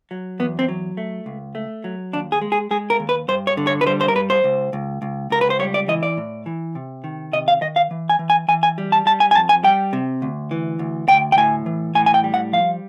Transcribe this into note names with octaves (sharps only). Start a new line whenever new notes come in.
F#3
E2 B3
C4
F#3
A3
C#2
A3
F#3
D#2 D4
G#4
G#3
G#4
G#3 G#4
A#4
D#2
B4
G2 C5
C#5
D3
C#5
B4
G3 C5
C5
A#4
G2 B4
C5
C#2
C#2
C#2
C#2 A#4
B4
C5
G3 C#5
D5
E3 D#5
D5
A2
E3
C3
D#3
C3 D#5
F5
D#3 D#5
F5
E3
G#5
E3
G#5
E3 G#5
G#5
G3
A5
G3 A5
G#5
G#5
F2 A5
G#5
G3 G5
C3
D2
E3
D2
D2 G5
G5
A2 G#5
E3
A2 G#5
G#5
G5
G3
F#5
F3 F5